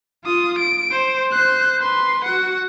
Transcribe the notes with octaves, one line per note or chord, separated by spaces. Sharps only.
F4 D#6
D7
C5
C5 F#6
B4 C6
F#4 F#5